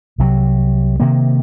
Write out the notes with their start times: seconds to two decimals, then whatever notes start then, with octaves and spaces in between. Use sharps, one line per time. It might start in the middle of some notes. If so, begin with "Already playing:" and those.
0.18 C2 C3 F#3
1.00 C3 D#3 A#3